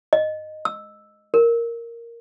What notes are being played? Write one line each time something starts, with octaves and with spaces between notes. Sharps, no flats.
D#5
E6
A#4